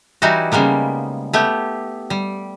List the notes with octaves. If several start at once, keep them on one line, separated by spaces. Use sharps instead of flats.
E3 G3 D#4 E4 F#4
C#3 G3 G#3 A#3 B3
A3 B3 G4
G3